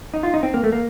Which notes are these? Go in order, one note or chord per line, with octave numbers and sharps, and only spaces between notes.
D#4
F4
D#4
C4
A#3
A3
A#3